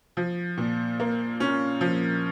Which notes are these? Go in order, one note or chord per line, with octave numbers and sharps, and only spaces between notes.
F3
A#2
A#3
C#4
F3